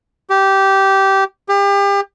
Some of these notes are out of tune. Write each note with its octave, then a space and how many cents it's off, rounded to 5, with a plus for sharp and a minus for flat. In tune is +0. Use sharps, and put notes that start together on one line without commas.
G4 -15
G4 +35